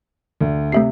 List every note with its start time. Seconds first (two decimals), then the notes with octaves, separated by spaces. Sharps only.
0.41 D2
0.72 C3 A3 E5 C7